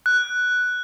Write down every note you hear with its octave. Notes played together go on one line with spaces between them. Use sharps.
F#6